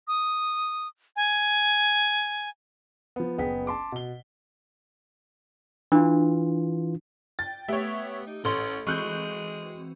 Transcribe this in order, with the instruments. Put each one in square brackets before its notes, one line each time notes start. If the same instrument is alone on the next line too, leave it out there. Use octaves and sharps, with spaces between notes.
[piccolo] D#6
G#5
[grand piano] F3 B3
F#1 B3 G#4 G5 B6
A5 C6 D6
B2 G7
[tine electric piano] E3 F4 [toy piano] D4
[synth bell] G5 [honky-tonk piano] A6
[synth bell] A3 G4 [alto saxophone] B3 [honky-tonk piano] C#5 E5
[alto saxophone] D#4
[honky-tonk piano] A1 [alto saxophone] C#4 [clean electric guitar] A4 C6
[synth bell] E3 C4 F#4 [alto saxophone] G#3 [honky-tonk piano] C#6 F#6 G6